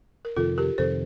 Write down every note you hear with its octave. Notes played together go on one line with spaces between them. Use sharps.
A#4
F2 C3 D#3 F4 A4
G4 A#4
F2 C3 D#3 A4 C5